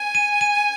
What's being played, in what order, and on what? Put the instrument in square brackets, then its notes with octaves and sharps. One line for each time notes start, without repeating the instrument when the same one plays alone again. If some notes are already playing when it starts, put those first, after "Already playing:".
Already playing: [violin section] G#5
[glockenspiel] D#7
D#7